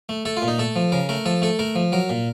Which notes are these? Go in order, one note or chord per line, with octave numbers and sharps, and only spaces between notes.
A3
A3 A4
F4
A#2
D#4
A3 A4
F3
C#3 A#4
A3 A#4
F3 A4
A3 A4
A3 A#4
F3
F#3 A#4
A#2